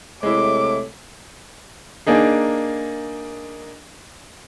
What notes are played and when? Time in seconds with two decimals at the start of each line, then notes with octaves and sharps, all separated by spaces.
0.23 C3 G#3 A3 E4 C#5 D6
2.07 A#3 D4 D#4 G#4